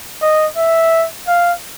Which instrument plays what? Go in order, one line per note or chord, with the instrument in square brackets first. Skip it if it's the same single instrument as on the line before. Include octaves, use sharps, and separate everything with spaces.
[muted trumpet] D#5
E5
F5